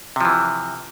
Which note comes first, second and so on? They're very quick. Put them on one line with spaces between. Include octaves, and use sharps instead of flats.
C3 F3 E3